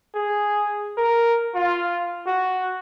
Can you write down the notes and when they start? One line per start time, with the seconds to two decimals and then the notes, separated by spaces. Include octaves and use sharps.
0.15 G#4
0.97 A#4
1.55 F4
2.26 F#4